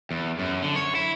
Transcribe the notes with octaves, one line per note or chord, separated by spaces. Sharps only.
E2
F#2
D3
C#5
E4